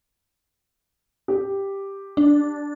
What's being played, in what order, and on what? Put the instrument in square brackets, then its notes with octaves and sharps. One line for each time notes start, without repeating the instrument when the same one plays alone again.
[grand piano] G4
[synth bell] D4